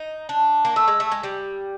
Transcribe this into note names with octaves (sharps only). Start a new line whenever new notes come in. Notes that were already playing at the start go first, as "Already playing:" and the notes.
Already playing: D#4
D4
A#3
A3 E6
G#3
A3
G#3
G3